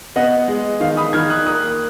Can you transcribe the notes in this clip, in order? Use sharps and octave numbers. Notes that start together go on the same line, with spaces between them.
B3 D#5 F#5
G#3
D#3 F5
B5 D#6
D#3 F6 G#6
D#6 F#6
A#3 D#6 F#6